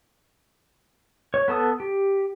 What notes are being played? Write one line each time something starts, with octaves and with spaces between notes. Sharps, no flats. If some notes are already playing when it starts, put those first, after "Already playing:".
C#5
B3 A4 A5 D#6
G4